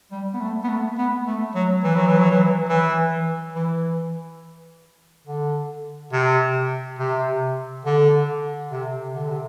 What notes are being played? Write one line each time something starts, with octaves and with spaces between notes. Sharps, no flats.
G3
B3
A3
B3
A3
B3
A3
F#3
E3
F#3
E3
F#3
E3
E3
E3
D3
C3
C3
D3
C3
D3
C3